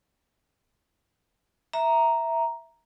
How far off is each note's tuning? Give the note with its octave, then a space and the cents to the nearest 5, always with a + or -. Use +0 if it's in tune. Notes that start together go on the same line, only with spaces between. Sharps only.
E5 -5 A#5 +0